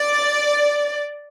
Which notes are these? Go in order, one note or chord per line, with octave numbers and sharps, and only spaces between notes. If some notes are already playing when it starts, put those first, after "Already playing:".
Already playing: D5